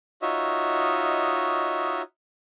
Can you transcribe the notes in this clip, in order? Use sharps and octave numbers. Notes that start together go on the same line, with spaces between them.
D#4 F4 F#4 C#5 D#5 E5